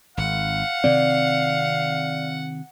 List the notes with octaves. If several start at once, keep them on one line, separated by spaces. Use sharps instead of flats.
G#1 F5 F#5
C3 D#3 C4 D5